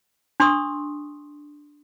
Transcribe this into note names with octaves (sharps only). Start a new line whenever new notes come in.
D4 C6 C#6 D#6 E6